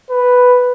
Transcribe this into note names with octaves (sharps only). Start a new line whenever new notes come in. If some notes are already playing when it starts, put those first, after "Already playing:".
B4